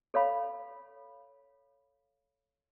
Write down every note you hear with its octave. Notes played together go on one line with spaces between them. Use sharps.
A4 C#5 F5 B5